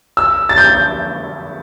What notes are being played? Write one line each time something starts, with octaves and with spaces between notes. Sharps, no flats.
E6
A6
G6